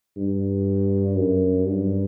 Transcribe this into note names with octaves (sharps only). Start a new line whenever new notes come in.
G2
F#2
G2